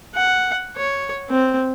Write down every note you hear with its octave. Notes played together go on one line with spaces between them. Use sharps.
F#5
C#5
C4